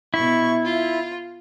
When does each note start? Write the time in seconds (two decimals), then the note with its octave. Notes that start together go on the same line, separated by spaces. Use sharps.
0.14 B2 E4 C#6
0.63 F4